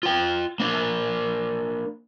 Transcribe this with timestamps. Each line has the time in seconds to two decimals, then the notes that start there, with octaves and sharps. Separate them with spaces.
0.03 F4 G5
0.60 A#3 D4